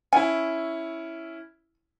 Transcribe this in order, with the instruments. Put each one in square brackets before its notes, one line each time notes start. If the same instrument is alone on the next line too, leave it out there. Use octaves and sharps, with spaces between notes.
[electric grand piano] C#4 E4 [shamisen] G#5